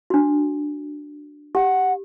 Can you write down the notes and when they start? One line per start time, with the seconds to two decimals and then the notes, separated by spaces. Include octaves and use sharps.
0.10 D4 F#4
1.55 G4 F#5